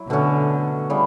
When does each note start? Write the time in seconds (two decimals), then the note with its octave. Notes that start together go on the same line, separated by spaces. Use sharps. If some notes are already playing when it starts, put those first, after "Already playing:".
Already playing: F#3 E4
0.09 B2 D3 A3 C#4 F#4
0.90 C#3 G3 B3 E4